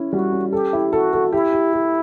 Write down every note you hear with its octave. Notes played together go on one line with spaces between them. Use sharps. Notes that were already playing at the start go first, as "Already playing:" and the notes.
Already playing: C#4 E4
G3 F#4
C#4
G4 A4
E4
F#4 A4
A4
E4 G4
G4
G4